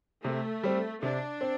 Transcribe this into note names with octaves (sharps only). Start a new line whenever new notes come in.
C3 A3
G3 C4
C3 D4
C4